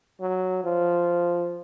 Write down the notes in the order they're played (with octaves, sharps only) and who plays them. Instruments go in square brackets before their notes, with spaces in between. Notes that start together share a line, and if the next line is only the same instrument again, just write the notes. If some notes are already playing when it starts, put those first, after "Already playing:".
[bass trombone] F#3
F3